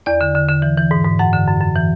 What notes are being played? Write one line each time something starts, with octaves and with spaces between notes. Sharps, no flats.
E2 D5
D3
D3
D3
E3
E3
G#2
G#2
F#2 F#5
D3
F#2
F#2
E3